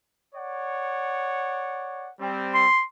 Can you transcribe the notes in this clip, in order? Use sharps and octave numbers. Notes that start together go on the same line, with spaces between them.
C#5 D5 F#5
G3 C4
C6